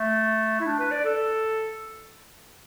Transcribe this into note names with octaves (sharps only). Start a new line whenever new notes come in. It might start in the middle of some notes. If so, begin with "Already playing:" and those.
Already playing: A3
E4
D4
B4
D5
A4